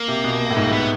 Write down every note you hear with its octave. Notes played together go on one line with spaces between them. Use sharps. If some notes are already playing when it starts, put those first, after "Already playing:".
Already playing: A#3
C3
B2
A2
G#2
B3